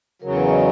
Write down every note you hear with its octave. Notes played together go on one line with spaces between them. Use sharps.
E2 C#3 F#3 A#4
B4
D#5